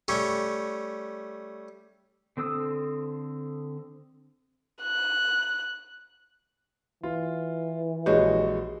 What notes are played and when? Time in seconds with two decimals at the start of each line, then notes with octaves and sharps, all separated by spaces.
0.08 G3 A3 C#4
2.37 D3 C4 A4 D#6 E6
4.83 F#6
7.03 E3 F4
8.06 A#1 G#3 F#4 G4 C#5 D#5